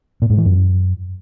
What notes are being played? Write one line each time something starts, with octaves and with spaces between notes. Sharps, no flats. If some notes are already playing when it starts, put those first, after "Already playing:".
A#2
G#2
E3
F#2